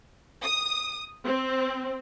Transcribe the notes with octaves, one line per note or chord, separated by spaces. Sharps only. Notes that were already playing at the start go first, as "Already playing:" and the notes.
D#6
C4